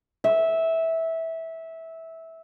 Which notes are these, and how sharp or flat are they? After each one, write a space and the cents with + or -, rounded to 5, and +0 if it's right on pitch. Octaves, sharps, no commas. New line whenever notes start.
E5 -15